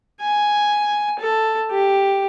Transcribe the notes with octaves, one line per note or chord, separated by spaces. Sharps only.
G#5
A4
G4